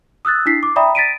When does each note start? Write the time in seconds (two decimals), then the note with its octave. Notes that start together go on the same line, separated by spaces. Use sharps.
0.25 D#6 E6 F#6 A6
0.46 D4 E4 B6 C7
0.63 D6
0.76 D5 E5 G5 A#5 B5 D#6
0.95 A6 B6 D7 D#7